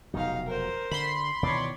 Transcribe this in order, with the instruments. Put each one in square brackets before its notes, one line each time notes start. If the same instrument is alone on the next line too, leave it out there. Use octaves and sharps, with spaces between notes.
[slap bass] F1 B2 F#3 [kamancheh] D#4 F5
[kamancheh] A#4 C5
[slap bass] D3 [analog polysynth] B5 C6
[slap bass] B2 D#3 E3 [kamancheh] C#5 D5